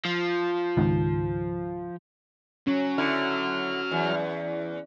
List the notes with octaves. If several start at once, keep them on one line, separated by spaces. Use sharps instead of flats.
F3
C#2 G#2 D#3
F#3 C#4
D3 E4 F6
E2